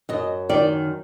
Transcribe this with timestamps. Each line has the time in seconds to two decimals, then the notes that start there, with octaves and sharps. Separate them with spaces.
0.09 F#2 D#5
0.49 D#3 D5